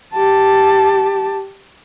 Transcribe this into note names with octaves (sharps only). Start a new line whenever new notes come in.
G4 A5